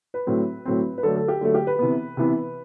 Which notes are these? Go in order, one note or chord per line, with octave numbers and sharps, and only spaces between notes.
B4
A2 F#3 C4
A2 F#3 C4
B4
D3 F#3 A3 A4
A4
G4
D3 F#3 A3
G4
B4
C3 E3 B3
C3 E3 B3